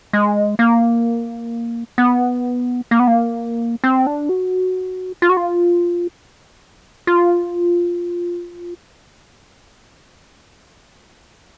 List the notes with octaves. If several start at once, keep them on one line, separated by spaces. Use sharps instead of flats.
G#3
A#3
B3
A#3
B3
A#3
C4
D4
F#4
F4
F#4
F4
F4